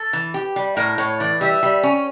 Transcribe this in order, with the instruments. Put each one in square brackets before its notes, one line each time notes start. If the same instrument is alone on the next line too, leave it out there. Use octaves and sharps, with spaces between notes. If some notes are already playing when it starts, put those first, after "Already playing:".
Already playing: [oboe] A4
[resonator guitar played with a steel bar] E3
G4
G3
[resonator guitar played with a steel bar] A2 [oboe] A#4
[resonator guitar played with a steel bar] A2 [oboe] C#5
[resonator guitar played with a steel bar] E3 [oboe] D5
[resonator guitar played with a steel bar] G3 [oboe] E5
[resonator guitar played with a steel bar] G3
C#4